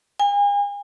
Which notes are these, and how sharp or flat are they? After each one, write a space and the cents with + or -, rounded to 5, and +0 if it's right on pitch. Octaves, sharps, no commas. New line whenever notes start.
G#5 -40